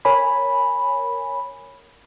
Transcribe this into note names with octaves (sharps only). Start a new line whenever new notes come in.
A#4 C#5 G#5 B5